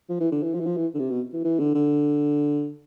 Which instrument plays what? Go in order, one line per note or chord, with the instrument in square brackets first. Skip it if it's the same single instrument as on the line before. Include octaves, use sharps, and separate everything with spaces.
[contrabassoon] F3
E3
D3
E3
F3
E3
F3
E3
D3
C3
B2
E3
E3
D3
D3